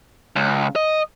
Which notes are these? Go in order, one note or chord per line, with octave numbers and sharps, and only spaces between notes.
C#2
D#5